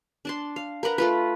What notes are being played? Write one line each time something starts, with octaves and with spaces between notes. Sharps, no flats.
D4 A5 C6
F5
A#4 B4 F#5 A#5
A3 F4 B4